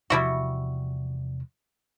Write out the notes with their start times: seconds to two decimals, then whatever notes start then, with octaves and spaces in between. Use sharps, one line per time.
0.10 E2 C3 F3 G3 E4 F#4